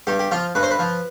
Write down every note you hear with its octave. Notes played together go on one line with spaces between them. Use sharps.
G2 G4
G4
F3 F4
G2 B4
C5
B4
F3